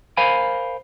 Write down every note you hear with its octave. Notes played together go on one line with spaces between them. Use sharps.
A#4 C5 F5 G#5 B5